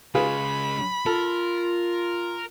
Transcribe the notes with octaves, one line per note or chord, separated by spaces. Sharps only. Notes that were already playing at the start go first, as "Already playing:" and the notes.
C#3 G#3 F4 G#4 B4 B5
F4 A4 A#4